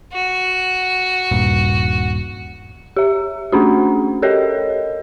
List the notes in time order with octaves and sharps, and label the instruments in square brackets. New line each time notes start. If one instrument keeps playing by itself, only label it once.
[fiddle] F#4
[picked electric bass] D#1 G2 A#2
[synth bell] G4 E5
A3 C#4 D4 F#4
G4 A4 A#4 C#5 D#5